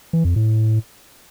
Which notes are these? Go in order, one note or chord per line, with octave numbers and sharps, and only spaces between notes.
E3
F2
A2